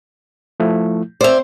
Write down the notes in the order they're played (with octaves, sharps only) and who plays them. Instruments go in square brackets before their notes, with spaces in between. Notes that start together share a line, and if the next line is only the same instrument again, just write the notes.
[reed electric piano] F3 A3 E4
[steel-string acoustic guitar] C4 C5 [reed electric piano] D5 E5